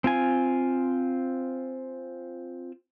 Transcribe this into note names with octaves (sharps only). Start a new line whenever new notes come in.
C4 F4 G#5